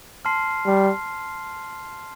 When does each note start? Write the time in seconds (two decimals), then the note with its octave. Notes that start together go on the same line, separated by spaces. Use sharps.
0.25 A5 C6 F6 C7
0.66 G3